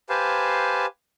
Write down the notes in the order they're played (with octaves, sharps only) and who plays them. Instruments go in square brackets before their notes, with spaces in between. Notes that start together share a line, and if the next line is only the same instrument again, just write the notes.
[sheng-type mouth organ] G4 B4 C5 F5 G#5 A5